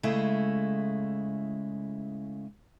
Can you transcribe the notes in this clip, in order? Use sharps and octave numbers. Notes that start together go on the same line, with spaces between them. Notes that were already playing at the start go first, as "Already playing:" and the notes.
C#3 G#3 A3 E4